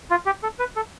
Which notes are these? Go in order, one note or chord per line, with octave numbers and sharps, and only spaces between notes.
F4
G4
A4
B4
A4